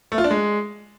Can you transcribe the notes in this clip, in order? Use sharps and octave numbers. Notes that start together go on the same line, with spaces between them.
A3
F4
D4
G#3